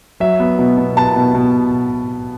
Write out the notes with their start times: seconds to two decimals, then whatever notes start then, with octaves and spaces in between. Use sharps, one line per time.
0.20 F#3 E5
0.40 B3
0.59 B2
0.78 B2
0.97 B3 A5
1.16 B2
1.34 B2